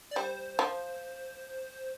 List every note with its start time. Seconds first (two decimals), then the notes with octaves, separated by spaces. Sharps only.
0.11 D5
0.16 G3 C5
0.59 F3